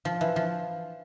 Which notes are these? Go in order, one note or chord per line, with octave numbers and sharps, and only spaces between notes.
F3
E3
F3